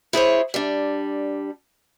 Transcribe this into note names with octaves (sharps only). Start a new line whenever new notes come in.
E4 G#4 C5 C#5
G3 D4